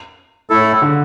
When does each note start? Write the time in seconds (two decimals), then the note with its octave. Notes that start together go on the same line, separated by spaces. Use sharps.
0.50 A2 A3 E4 A4
0.82 D3